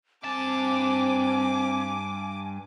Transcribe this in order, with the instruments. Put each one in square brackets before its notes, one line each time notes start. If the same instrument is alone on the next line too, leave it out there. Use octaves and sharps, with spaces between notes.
[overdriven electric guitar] G2 A5 [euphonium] C4 [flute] G#5 [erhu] D6